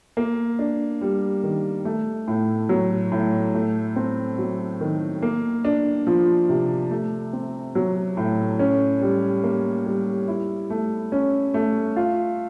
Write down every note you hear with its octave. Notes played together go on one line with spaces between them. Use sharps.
A#3
D4
G3
D#3
A3
A2
F#3
A2
A3
C4
F#3
D#3
A#3
D4
F3
C3
A3
C4
F#3
A2
C#4
G3
A#3
G3
E4
A3
C#4
A3
F4